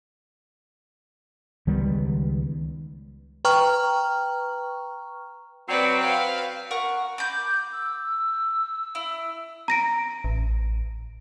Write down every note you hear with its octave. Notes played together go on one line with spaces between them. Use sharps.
C#2 D#3 G3 B3
B4 G5 A#5 C#6 F6
F#3 C4 B4 D5
B4 F5
A#4 F#5 C#6
B5 D6 G6
E6
E4
A#5 A#6 D7
A1